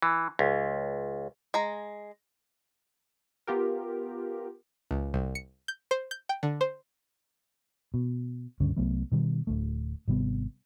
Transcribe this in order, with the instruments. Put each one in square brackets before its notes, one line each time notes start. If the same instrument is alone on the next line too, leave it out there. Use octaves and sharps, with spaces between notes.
[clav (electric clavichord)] E3
C#2
[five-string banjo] G#3 A#5
[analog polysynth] B3 F4 G4 A#4
[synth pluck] C#2
C2
C#7
G6
C5
G6
G5
D3
C5
[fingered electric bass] B2
C#2 G2 D3 C#4
C2 F#3 A3 B3
B2 D#3 G3
D1 D2 A3
G#1 C3 G3 B3